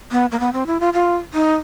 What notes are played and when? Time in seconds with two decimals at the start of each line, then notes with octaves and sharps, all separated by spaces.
0.11 B3
0.32 A#3
0.40 B3
0.53 C4
0.66 E4
0.80 F4
0.93 F4
1.34 D#4